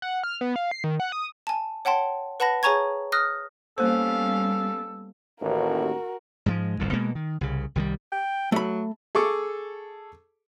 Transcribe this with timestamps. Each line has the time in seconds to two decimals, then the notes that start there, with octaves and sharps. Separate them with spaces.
0.02 F#5
0.24 F6
0.41 B3
0.56 F5
0.71 C7
0.84 D#3
1.00 F#5
1.12 D#6
1.47 G#5 A5
1.85 C#5 F#5 G5 A5 C6
2.40 B4 F#5 A5 B5 A#6
2.63 G#4 C#5 G#5 A#5 C#6 G#6
3.12 D#6 F6 F#6 A#6
3.78 G3 A#3 B3 C#4 A4 C5 F5
5.42 A1 D#2 F#4 A#4
6.46 G#2 F3 G#3
6.79 G1 C2 A2
6.93 B2 G#3 A#3
7.15 D#3
7.41 C2 C#3
7.75 C2 D#3 F#3 G3
8.12 G5
8.52 F#3 A3 B5
9.15 G#4 A4 C#6 D6